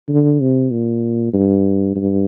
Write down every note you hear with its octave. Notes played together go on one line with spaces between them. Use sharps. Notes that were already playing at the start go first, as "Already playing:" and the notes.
D3
C3
A#2
G2
G2